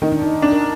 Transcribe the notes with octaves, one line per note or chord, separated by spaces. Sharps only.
D#3 D#4
D4
D#4
D4
A#4